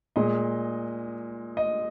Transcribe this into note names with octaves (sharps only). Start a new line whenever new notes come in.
A#2 G#3 D#5
D#5